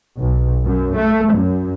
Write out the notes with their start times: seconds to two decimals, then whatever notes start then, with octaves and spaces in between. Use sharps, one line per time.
0.19 B1
0.65 F#2
0.96 A3
1.33 F#2